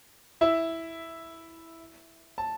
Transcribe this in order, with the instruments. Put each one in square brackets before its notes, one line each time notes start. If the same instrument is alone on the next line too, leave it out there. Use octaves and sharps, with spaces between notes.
[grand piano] E4 E5
A5